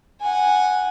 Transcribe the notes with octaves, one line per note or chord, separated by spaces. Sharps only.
F#5 G#5